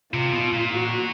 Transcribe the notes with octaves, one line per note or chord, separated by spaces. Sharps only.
C3 F4
B2
A#2
F#4